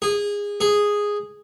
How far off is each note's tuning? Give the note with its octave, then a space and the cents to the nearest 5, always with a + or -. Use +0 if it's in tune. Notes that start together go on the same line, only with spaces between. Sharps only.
G#4 -20
G#4 -5